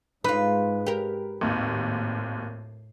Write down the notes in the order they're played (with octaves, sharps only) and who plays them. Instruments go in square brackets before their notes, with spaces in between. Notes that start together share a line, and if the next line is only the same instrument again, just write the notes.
[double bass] G#2 G#3 [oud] D#4 F4 [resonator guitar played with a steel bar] B4
[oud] G4 A#4
[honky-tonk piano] G#1 D#2 [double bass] A2